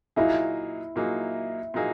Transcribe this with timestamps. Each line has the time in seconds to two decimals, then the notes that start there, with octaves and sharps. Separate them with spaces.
0.16 A#2 F#3 A#3 D#4 E4 G#4
0.96 A#2 F#3 A#3 D#4 G#4
1.74 A#2 F#3 A#3 D#4 G#4